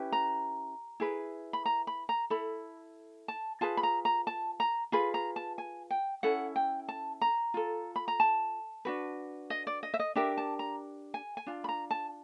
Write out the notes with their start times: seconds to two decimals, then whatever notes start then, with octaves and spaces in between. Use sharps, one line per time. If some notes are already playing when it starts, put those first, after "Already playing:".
Already playing: C#4 E4 G4 B4
0.12 A#5
1.00 E4 G#4 B4
1.53 B5
1.66 A#5
1.87 B5
2.09 A#5
2.30 E4 A4 B5
3.28 A5
3.61 F4 G#4 B4 A5
3.77 B5
3.83 A#5
4.05 A#5
4.27 A5
4.60 A#5
4.92 F4 G#4 B4 B5
5.14 A#5
5.36 A5
5.58 G#5
5.91 G5
6.23 C#4 E4 A4 F#5
6.56 G5
6.89 A5
7.21 A#5
7.54 F4 A4
7.96 B5
8.08 A#5
8.20 A5
8.85 D4 F#4 B4
9.50 D#5
9.67 D5
9.83 D#5
9.94 E5
9.99 D#5
10.16 D4 G4 A#4 E5
10.37 A5
10.59 A#5
11.14 G#5
11.37 G#5
11.47 D4 F4
11.64 B5
11.69 A#5
11.91 A5